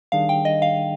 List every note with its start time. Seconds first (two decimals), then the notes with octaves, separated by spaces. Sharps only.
0.12 D#3 G3 D4 G#4 F5
0.29 G5
0.45 D#5
0.62 F5